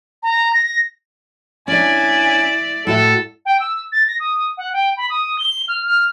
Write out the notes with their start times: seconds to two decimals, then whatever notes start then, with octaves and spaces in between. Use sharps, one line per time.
0.23 A#5
0.53 A#6
1.68 C#4 D4 E4 D5 G#5
2.87 A2 F#4 A4 E5
3.45 G5
3.60 E6
3.92 A6
4.08 A#6
4.20 D#6
4.57 F#5
4.73 G5
4.97 B5
5.10 D#6
5.39 G7
5.68 F6
5.85 F6